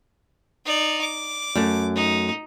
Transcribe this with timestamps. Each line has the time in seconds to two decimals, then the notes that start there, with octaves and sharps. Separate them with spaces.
0.65 D#4 D5
1.01 D6
1.55 F#2 A3
1.96 D#4